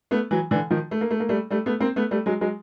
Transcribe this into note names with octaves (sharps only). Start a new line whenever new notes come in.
A3 B3
E3 F#3
D3 E3
D#3 F3
A3
A#3
A3
A#3
G3 A3
G3 A3
A3 B3
A#3 C4
A3 B3
G3 A3
F#3 G#3
F#3 G#3